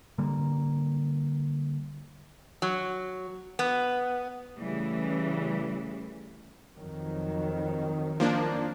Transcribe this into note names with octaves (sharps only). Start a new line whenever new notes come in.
D3 G3 A#3
F#3
B3
C#3 E3 G3 A3
F2 D#3 F#3
F3 A#3 D4